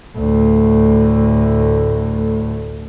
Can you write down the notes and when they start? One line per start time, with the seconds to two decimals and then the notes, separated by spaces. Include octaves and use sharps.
0.17 D2 A2